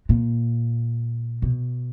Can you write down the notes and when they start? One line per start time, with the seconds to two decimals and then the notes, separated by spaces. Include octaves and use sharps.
0.09 A#2
1.42 B2